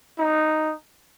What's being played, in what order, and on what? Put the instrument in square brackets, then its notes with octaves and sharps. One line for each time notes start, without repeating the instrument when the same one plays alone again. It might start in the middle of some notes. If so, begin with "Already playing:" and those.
[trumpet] D#4